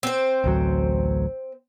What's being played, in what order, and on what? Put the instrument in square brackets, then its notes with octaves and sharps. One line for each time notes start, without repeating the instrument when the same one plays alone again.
[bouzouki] C4 C5
[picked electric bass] A1 D2 F#3